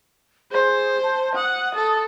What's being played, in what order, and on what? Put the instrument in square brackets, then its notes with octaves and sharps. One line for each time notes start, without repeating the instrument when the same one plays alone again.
[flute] G#4 [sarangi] C5
[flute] A5
[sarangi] F#5 [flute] D#6
[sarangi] A4